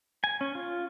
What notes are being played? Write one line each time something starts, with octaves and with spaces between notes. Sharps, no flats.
G#5
C#4
F4